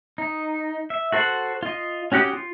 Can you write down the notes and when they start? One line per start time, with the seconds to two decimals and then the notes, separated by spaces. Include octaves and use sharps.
0.18 D#4
0.90 E5
1.12 F#4 A4 C5 F#5
1.63 F4 D#5
2.12 C#4 F#4 G4 F#5 D#6
2.33 F4